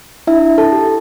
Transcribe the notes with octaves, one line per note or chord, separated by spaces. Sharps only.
D4 E4 E5
A4 A5
G4